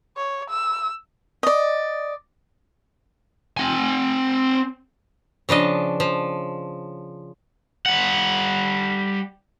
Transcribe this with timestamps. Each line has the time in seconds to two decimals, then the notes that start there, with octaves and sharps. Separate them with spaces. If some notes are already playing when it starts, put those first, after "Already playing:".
0.17 C#5
0.50 E6
1.43 D5 D#5
3.57 C4 G#5
5.49 C#3 F3 D4 D#5
6.00 F3
7.86 G3 F#5